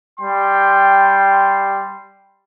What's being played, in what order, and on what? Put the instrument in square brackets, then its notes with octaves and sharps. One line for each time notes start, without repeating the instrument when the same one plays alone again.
[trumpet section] G3 G5 C6